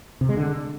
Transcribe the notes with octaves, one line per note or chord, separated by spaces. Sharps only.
C3
G#3
D3